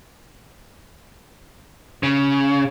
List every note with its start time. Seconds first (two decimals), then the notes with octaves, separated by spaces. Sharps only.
2.03 C#3